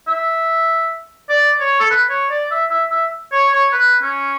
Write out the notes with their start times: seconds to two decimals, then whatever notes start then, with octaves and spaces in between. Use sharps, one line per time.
0.08 E5
1.29 D5
1.60 C#5
1.80 A4
1.90 B4
2.10 C#5
2.30 D5
2.51 E5
2.71 E5
2.92 E5
3.32 C#5
3.52 C#5
3.72 B4
4.02 C#4